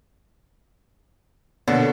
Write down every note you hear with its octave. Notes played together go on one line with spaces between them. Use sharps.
B2 D3 A#3 A4 C#5